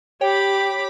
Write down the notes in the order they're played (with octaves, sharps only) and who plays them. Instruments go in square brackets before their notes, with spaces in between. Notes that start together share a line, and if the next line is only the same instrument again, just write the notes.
[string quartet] G4 B5 D6 [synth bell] C#5 G5